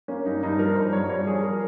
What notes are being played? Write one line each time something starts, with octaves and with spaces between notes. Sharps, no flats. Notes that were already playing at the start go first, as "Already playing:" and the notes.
A#3 C#4
G2 D#4
G2 D#4
F3 A#4
G2 C5
G2 C#5
G2 C#5
F3 G#4
A#4